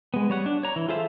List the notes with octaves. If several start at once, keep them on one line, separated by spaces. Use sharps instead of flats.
G#3 B3
G3 C#5 F#5
D4
C#5 A#5
E3
F4 G#4 A4 C5 E5